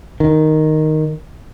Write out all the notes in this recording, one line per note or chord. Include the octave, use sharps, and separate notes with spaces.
D#3